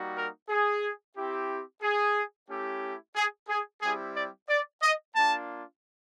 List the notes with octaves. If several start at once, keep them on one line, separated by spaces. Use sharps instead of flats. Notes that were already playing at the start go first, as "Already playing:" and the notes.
Already playing: G3 A#3 D#4 F#4
A#4
G#4
C4 E4 G4
G#4
A3 C#4 E4 G4
G#4
G#4
G3 C4 E4 G4 G#4
D5
D5
D#5
A#3 D4 F4 A5